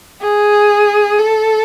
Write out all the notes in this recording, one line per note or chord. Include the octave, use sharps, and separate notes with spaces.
G#4
A4